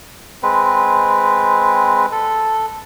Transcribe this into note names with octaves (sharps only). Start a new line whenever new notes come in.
G#3 C4 B4
A4